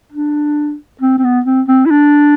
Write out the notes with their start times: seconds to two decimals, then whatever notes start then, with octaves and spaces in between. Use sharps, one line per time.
0.12 D4
1.01 C4
1.19 C4
1.24 B3
1.46 C4
1.68 C4
1.86 E4
1.91 D4